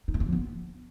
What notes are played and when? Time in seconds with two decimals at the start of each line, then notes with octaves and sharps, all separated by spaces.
0.08 D#4
0.14 A3
0.20 D4
0.26 F3
0.32 B3